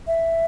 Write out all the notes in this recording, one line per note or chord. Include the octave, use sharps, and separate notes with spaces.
E5